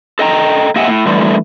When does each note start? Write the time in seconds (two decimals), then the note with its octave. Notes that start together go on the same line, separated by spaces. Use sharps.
0.19 A4 D#5 G5 A#5
0.76 A#3 G4 D#5 E5 F#5 G#5
0.88 A2
1.07 D3 E3 G3 A3